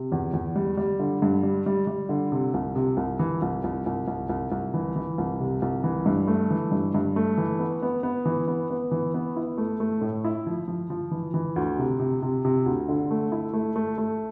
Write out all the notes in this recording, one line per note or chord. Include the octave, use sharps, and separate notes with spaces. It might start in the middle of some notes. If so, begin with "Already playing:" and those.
Already playing: C3
E2
E2
G3
G3
D3
G2
G3
G3
G3
D3
C3
C2
C3
C2
E3
C2
C2
C2
C2
C2
C2
E3
E3
C2
C3
C2
E3
G2
A3
E3
G2
G2
A3
E3
B3
B3
B3
E3
B3
B3
E3
B3
E4
A3
A3
A2
E4
F3
F3
F3
E3
E3
D2
C3
C3
C3
C3
D2
D3
A3
E4
A3
A3
A3